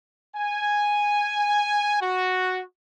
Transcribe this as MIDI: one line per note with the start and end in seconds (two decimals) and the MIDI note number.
0.35 2.00 80
2.01 2.62 66